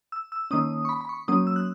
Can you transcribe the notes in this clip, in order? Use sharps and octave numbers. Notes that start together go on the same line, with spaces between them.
E6
E6
D#3 A#3 C#4 D#6
C#6
B5
B5
C#6
F#3 A#3 C#4 D#6
E6
F#6